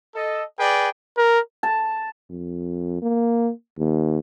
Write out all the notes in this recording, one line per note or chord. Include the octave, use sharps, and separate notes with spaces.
A4 D#5
G#4 B4 D5 G5
A#4
A5
F2
A#3
D#2